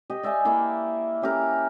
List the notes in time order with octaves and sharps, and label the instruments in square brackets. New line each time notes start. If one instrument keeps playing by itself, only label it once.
[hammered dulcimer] G4 D#5
D5 E5 G5 G#5
A#3 E4 D5 G5
C#4 G4 A#4